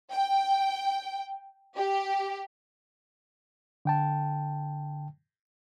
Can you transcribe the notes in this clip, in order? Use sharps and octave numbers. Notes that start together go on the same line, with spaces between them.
G5
G4
D3 G5 A5